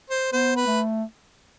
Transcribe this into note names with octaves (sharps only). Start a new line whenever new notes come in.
C5
B3 C5
B4
A3